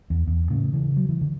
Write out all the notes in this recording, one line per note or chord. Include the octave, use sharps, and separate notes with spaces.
E2
E2
A2 C#3
C#3 E3
F#3
E3
D3